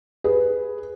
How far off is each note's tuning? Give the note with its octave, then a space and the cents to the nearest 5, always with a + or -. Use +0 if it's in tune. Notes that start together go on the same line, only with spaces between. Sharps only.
G#4 +0 B4 +0